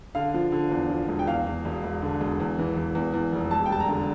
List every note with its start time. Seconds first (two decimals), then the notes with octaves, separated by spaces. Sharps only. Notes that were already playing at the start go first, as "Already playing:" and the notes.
0.15 D3 F5
0.34 F3
0.52 D3
0.71 E2
0.89 F3
1.08 E1
1.19 G5
1.27 E2 F5
1.47 E2
1.65 E1
1.84 E1
2.02 D3
2.21 E1
2.40 E2
2.59 E3
2.76 E2
2.95 E2
3.14 E2
3.32 F1
3.51 E1 A5
3.66 G5
3.70 G3 A5
3.80 A#5
3.89 D3